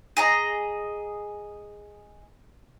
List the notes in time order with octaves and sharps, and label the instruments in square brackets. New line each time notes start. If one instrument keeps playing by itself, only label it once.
[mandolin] G#4 D#5 A#5